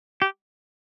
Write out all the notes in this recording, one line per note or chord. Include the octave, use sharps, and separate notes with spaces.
G4